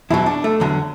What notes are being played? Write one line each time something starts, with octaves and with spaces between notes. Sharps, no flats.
E2 B2 F#3 E4
D4
A3
E2 D3 F#3